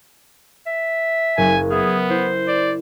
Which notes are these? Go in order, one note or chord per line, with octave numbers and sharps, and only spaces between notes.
E5
F#1 C#4 G#5 G#6
B3 G#4 E5 F6
E4 C5
D5 E7